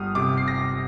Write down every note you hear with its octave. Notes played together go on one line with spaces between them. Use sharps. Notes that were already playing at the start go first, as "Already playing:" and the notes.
Already playing: G1 G3 D#6 F6
C3 D6
C7
A#6